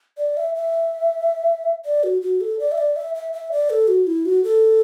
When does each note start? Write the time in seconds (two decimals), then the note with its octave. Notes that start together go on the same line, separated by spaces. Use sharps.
0.18 D5
0.37 E5
0.55 E5
1.85 D5
2.04 F#4
2.22 F#4
2.41 A4
2.59 D5
2.72 E5
2.78 D5
2.96 E5
3.15 E5
3.33 E5
3.52 D5
3.70 A4
3.88 F#4
4.07 E4
4.25 F#4
4.44 A4